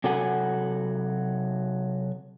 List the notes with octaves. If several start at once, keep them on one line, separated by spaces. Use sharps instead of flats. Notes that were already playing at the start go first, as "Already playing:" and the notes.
C3 F#3 F#4 A4 F#5 G#5